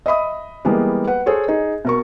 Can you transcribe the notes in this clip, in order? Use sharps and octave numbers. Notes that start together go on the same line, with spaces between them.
D#5 E5 B5 D#6
E3 G3 G#3 A#3 B3
B4 F#5
G#4 A4 C5 C#5
D#4 G#4
B2 A#4 C#6